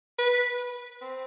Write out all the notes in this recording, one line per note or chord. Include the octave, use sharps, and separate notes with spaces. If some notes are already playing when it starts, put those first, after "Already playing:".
B4
C4